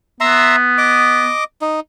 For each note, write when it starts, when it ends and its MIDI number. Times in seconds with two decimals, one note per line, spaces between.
0.20 1.31 59
0.20 0.56 76
0.20 0.56 82
0.20 0.56 84
0.78 1.44 75
0.78 1.44 86
1.61 1.80 63